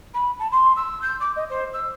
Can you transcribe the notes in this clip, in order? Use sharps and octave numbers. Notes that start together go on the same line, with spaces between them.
B5
A5
C6
E6
G6
D6
D#5
C5
E6